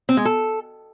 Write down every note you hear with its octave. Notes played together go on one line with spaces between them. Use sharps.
C4
G#3
A4